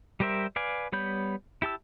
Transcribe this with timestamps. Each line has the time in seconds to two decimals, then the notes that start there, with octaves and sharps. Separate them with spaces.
0.20 G3 G4 A#4 C5 E5
0.56 B4 D5 F5 G#5
0.92 G3 B3 C#5 B5 G6
1.62 E4 G4 A5 E6